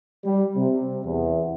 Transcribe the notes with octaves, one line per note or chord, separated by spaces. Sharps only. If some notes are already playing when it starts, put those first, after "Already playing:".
G3
C3
E2